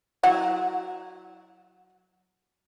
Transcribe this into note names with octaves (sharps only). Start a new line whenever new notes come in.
F#3 E4 F#5